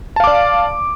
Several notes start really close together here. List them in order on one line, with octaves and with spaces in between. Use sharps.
A5 F5 D6 D5